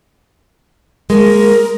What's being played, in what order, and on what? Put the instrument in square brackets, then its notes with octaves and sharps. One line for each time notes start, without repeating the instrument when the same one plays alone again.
[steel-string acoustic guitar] G#3 A#3 [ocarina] A#4